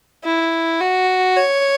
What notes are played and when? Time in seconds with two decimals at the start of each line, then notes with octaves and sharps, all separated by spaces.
0.24 E4
0.81 F#4
1.37 C#5